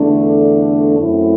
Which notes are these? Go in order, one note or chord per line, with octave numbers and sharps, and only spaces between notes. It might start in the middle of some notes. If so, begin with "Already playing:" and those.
Already playing: E2 D3 A3 D4
F#2 F#3 A3 C4 E4